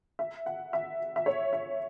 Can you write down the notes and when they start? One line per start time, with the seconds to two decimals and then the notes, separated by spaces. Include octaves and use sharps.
0.19 E5
0.46 F#5
0.73 E5
1.16 E5
1.26 C#5
1.53 E5